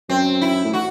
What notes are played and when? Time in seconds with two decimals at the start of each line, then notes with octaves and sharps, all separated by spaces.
0.09 F#2 C4
0.41 E4
0.64 A2
0.73 F#4